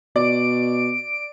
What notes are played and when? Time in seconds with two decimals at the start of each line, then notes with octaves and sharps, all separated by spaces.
0.16 B2 D5 D7